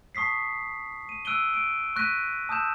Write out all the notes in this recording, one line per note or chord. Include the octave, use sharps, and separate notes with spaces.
A5 C#6 D#6 B6 C7
D#7
E6 F#6 D7 D#7 G7
D7
C#6 F#6 A#6 B6 D#7
A5 D#6 E6 G6 E7